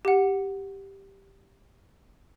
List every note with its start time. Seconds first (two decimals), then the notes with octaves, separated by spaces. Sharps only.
0.05 G4 F#5